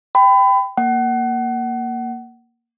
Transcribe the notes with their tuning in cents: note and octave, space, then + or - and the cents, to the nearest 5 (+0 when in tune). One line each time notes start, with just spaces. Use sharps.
G5 +0 B5 +30
A#3 +0 F#5 +25